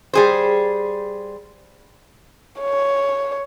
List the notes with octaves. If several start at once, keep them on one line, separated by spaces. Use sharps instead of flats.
G3 G#4 C5
C#5